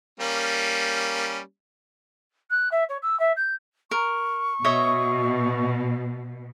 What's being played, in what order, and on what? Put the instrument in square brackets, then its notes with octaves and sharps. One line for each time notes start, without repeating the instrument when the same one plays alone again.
[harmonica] G3 A#3 C#4
[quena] F#6
E5
C#5
E6
E5
G6
[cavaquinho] A#4 [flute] C#6
[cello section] B2 [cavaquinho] C#5 D#5 E5